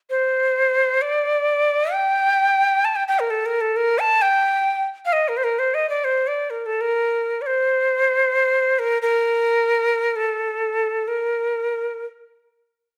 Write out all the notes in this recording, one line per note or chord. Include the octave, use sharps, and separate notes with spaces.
C5
D5
G5
A5
G5
G5
A#4
A4
A#4
A4
A#4
A5
G5
F5
D#5
A#4
C5
A#4
C5
D#5
D5
C5
D5
A#4
A4
A#4
D5
C5
A#4
A#4
A4
A#4